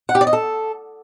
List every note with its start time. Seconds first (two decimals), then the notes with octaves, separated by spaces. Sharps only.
0.09 F#5
0.15 G4
0.21 D5
0.27 D#5
0.33 A4